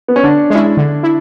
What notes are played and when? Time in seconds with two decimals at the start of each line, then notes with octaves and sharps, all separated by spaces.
0.08 B3
0.16 C#4
0.24 D3 D4
0.50 G#3 C#4 E4
0.77 D3
1.03 E4